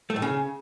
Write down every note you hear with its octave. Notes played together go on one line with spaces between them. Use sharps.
A3
A2
C#3